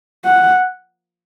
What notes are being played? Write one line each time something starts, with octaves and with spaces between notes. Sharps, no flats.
F#5